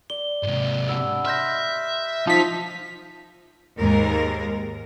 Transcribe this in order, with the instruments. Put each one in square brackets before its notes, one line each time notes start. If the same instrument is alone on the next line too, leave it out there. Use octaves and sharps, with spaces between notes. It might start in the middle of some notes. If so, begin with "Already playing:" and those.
[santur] D5 [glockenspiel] G7
[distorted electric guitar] G#2 C3
[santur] B3 D4 G4 [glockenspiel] E6
[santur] C5 D#5 [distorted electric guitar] E5 [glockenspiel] F6 G6 A#6
[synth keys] F3 B6 [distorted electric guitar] D#4 [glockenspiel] A5
[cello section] D#2 G#2 G#3 A#4